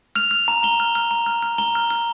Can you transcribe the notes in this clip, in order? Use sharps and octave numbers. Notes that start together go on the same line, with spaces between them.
F6 F7
F6
A#5
A#5 G7
F6
F6
A#5
F6
F6
A#5 G7
F6
F6